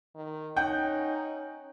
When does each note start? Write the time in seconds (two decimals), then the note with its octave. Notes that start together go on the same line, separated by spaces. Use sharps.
0.15 D#3
0.57 C#4 D#4 F#5 G5 G6